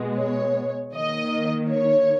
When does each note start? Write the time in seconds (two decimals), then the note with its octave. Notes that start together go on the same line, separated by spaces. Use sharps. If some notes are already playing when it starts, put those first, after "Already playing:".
Already playing: B2 G#3 B3
0.17 C#5
0.94 D#3 A#3 D#5
1.70 C#5